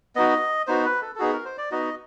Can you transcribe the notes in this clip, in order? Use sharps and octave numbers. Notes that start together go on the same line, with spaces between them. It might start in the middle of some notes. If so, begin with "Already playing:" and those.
B3 D#4 F#4 D#5
B3 D#4 F#4 C5
B4
A4
A4
B3 D#4 F#4 G#4
A#4
C5
D5
B3 D#4 F#4 D#5